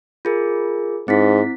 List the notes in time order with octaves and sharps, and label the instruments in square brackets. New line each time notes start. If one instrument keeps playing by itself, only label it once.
[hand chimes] F4 G#4 A#4
[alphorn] G#2 [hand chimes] C4 E4 B6